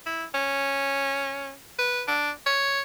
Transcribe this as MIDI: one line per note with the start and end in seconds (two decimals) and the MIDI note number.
0.06 0.24 64
0.34 1.53 61
1.79 2.03 71
2.08 2.31 62
2.46 2.81 73